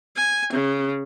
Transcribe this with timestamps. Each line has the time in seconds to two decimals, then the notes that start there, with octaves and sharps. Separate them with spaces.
0.16 G#5
0.53 C#3